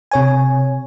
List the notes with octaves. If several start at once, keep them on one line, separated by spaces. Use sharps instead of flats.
C3 C#5 G#5